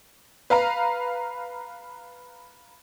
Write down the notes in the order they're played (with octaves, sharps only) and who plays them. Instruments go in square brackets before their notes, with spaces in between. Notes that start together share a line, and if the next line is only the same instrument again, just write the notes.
[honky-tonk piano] B4 F5 A#5